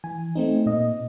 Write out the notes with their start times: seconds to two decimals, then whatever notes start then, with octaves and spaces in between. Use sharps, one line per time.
0.04 E3 G#5
0.36 A3 C4 D#4
0.66 A#2 D#5